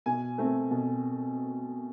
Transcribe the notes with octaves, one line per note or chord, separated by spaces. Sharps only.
B2 G#5
A3 C4
B2